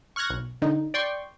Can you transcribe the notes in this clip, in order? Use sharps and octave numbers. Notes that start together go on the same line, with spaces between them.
C#6 F6 F#6 G#6 A#6
B1
D3 D#4
D5 G5 C6 C#6